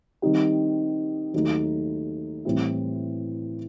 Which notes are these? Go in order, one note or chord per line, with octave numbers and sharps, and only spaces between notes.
D#3 G3 C4 D#4 G4
D#2 D#3 F#3 A3 D#4
A2 E3 G3 C4 E4